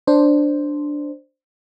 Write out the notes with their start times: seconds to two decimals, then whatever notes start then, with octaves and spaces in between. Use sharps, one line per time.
0.07 D4 C5